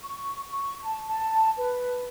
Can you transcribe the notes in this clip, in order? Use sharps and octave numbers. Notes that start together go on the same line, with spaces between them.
C#6
C#6
A5
A5
B4